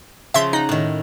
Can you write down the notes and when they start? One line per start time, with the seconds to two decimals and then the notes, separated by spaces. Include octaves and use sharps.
0.34 C#3 F3 E5 C6
0.53 D#4 F#5 A#5
0.69 A2 D#3